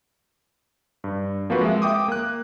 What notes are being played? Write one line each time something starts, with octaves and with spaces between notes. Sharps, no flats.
G2
F3 A#3 C4 F4 F#4 B4
G#3 E5
E5 G5 D6 D#6
A#3 F#6